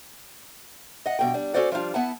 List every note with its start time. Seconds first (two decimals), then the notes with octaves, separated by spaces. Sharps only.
1.06 D#5 F#5
1.19 G2 B2 G5
1.34 G3 D4
1.54 C#4 F#4 A4 C5 D5 F#5
1.72 F3 G3 D4 F4
1.94 B3 E4 F#5 A5